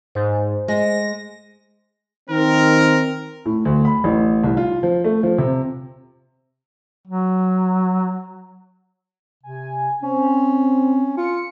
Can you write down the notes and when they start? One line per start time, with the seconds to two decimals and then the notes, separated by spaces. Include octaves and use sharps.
0.15 G#2 C5
0.68 G#3 A#6
2.30 D#3 C4 A#4
3.46 A2
3.65 D2
3.85 B5
4.04 A1
4.44 C2
4.57 F4
4.83 F3
5.04 A3
5.23 F3
5.38 C3
7.07 F#3
9.43 C3 G#5
10.03 C4 C#4
11.17 F4 C#7